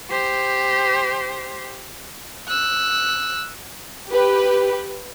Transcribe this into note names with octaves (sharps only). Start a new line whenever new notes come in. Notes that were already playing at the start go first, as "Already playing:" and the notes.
G4 C5
E6 F#6
G4 B4